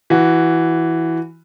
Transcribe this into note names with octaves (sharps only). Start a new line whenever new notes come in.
E3 F#4